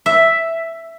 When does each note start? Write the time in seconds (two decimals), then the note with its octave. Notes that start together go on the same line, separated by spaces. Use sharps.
0.06 E5